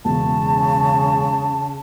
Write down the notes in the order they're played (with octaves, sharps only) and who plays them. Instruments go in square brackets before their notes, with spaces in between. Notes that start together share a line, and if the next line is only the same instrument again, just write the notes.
[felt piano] E1 [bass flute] C#3 [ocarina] A5